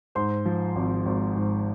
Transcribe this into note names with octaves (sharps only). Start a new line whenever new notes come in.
G#2 C5 C6
F3
G#1
G#1
G#2